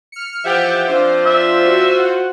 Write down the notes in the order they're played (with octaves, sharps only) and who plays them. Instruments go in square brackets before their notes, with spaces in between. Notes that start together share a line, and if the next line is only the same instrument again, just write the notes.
[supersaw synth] F6 C#7
[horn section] E3 F3 G4 [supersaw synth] E5 F#5 G5
[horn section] F3 C4 D4 [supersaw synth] F4 C5
[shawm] E5
[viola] F#4
[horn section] F#5